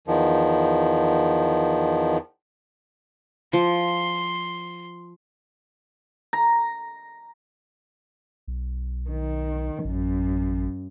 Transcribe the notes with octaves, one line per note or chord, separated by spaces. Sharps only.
E2 D#3 F3
F3 C6
A#5
B1
D#3
A1 F#2